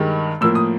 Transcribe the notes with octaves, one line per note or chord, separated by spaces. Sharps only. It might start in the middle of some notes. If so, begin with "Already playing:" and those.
Already playing: G2 D#3 G#3
A2 F3 A#3 E6
D#6